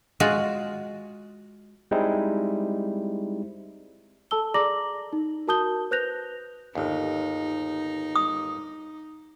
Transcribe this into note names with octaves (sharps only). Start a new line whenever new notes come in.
G#3 F4 F#4
G3 G#3 C4 D#4 E4
A4 A5 E6 G7
G#4 D5 A#5 D6 A#6 F#7
D#4
F#4 A#4 A5 D#6 G6 G7
B4 C5 F#6 G6 A#6 F7
G1 D#2 D#4
D#6